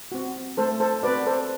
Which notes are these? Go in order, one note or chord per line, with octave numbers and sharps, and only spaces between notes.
C4 F#4
A3 A4 C5
A4 C5
C4 F#4 B4 D5
A4 C5